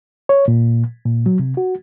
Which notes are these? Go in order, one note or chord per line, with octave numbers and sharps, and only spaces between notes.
C#5
A#2
A#2
F#3
C3
F#4